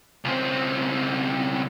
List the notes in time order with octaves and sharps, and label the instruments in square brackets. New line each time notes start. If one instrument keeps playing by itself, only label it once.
[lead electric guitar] C#2 C4